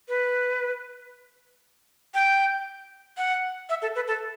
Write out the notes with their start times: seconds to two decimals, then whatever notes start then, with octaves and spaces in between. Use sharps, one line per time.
0.09 B4
2.14 G5
3.17 F#5
3.69 E5
3.82 A4
3.95 B4
4.08 A4